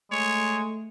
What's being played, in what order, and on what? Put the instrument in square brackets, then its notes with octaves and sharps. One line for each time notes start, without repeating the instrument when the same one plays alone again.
[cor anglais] G#3 [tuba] A3 [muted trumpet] C#5